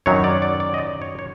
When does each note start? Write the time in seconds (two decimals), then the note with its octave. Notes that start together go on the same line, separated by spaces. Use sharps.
0.06 F#2 D#3 F#3 C#5
0.24 D5
0.42 D5
0.60 D5
0.74 D#5
0.78 D5
1.02 C#5
1.19 C#5